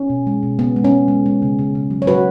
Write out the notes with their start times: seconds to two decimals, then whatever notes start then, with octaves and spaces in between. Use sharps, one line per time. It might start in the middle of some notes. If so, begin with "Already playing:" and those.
Already playing: C#4
0.10 B2
0.27 G#3
0.43 B2
0.59 C#3 B3
0.76 G#3
0.84 C#4
0.92 G#3
1.08 G#3
1.26 G#3
1.42 C#3
1.59 C#3
1.75 C#3
1.90 F#3
2.02 C#5
2.07 F#3 F#4 B4